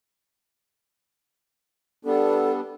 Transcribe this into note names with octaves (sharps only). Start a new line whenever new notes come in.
G3 B3 D4 A4